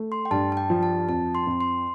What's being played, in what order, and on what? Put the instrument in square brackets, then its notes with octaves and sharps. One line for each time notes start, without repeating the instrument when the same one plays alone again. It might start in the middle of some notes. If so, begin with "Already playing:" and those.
Already playing: [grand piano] A3
[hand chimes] C6
G5
[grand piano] G2 [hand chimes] A5
[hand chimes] A5
G5
[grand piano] F3
[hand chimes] A5
[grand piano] F2 [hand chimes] A5
[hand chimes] C6
[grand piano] F2
[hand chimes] C6